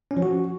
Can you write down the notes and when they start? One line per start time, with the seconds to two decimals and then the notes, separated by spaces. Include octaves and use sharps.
0.11 C#4
0.17 F3
0.22 F#4